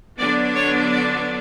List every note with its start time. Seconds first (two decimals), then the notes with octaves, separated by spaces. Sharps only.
0.18 D3 F#3 B3 D4 D5
0.55 C#5
0.92 D5